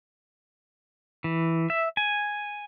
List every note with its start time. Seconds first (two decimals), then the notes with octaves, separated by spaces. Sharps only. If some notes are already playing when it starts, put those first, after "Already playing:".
1.24 E3
1.70 E5
1.97 G#5